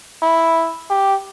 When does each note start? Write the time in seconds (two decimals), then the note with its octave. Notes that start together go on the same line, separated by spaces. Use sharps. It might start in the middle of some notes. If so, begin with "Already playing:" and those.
0.22 E4
0.90 G4